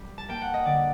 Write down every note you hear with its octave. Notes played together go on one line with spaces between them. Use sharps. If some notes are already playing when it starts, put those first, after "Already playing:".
Already playing: G3
A5
A#3 G5
F#5
D#5
D3 D5